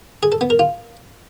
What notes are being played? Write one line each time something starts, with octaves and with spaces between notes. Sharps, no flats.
G#4
A4
B3
A#4
F4